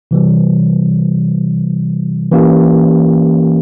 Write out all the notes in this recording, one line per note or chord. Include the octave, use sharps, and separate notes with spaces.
C3 E3 G3
E3 A#3 C#4 G4